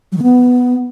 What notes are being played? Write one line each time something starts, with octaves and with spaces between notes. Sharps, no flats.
F#3
D#3
B3